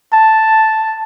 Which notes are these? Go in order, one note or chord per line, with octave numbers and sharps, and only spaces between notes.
A5